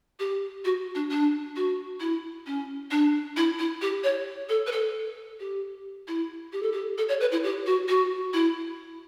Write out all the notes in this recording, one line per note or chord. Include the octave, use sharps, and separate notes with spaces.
G4
F#4
D4
D4
F#4
E4
C#4
D4
E4
E4
G4
C#5
A4
B4
A4
G4
E4
G4
A4
G4
A4
C#5
B4
E4
G4
F#4
F#4
E4